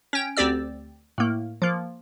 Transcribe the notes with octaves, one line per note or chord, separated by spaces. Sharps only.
C#4 G5
D2 C4 G4 D5 E6
A2 A#3
F3 A#3